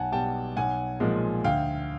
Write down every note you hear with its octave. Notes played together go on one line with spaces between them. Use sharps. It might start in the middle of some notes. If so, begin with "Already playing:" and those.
Already playing: B1 F#5 G#5 A5
B2 G3 G5 A5
B1 F#5 G#5
A#2 F3 G#3
D2 F5 G5